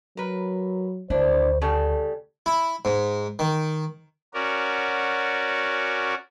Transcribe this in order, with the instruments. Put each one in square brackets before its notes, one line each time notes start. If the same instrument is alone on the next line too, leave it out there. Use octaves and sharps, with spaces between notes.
[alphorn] F#3 [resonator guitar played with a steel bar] A#4 B4
[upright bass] D2 [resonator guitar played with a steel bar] D4 E4 [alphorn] C5
[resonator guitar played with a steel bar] C#3 G3 A5 [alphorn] A4
[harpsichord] E4
G#2
D#3
[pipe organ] C#4 F#4 A#4 D5